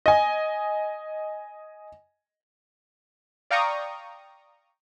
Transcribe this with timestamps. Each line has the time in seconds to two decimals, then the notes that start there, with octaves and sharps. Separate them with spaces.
0.06 D#5 G#5
3.51 D5 F5 G5 A#5 C#6 D#6